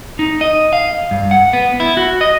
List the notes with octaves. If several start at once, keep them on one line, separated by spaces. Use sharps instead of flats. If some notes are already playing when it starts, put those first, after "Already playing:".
D#4
D#5
F5
G2
F#5
B3
E4
F#4
D#5